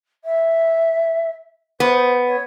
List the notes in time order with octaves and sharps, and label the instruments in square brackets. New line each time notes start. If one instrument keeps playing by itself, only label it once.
[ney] E5
[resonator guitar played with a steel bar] B3 [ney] C5
[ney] C#5